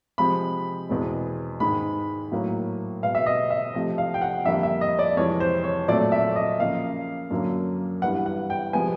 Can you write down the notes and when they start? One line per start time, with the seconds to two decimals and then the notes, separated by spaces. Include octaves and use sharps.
0.18 C3 F3 G#3 C4 B5
0.89 E2 B2 G#3 C4
1.60 G#2 D#3 G#3 B5
2.32 A2 F#3 A#3
3.03 B2 G#3 B3 F5
3.15 E5
3.26 D#5
3.50 E5
3.74 C3 F3 A3 C4
3.98 F5
4.14 G5
4.22 F#5
4.45 F2 D3 G3 A#3 E5
4.63 E5
4.81 D#5
4.99 D5
5.17 F2 C3 E3 G#3 C#5
5.40 C5
5.64 C#5
5.88 A#2 F#3 A3 C4 D5
6.12 E5
6.36 D#5
6.59 C#3 F3 A#3 F5
7.31 F#2 D3 F#3 A#3
8.02 G2 E3 G3 B3 F#5
8.26 F#5
8.50 G5
8.73 C3 F3 G#3 B3 G#5